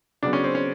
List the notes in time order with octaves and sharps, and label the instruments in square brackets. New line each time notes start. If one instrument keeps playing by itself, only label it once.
[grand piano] C#3 F#3 B3 [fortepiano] D4
[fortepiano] C#4
C4
C#4